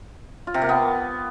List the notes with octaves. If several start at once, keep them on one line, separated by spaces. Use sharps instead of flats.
F4
C3
A#3
B3